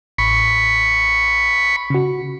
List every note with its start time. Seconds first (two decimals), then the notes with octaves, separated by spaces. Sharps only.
0.18 A1 B5 C#6
1.90 C#3 F#4